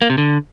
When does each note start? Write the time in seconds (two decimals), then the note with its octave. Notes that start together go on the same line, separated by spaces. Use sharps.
0.02 A#3
0.10 C3
0.18 D3